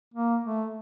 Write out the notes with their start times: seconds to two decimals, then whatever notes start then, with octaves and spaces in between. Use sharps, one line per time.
0.14 A#3
0.44 A3